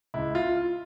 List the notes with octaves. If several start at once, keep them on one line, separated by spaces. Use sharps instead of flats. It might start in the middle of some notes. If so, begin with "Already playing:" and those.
C#2 E4
F4